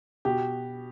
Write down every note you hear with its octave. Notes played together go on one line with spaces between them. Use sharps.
B2 G4